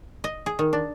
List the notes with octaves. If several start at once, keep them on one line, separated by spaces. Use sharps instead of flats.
D#5
G#4
D#3
D4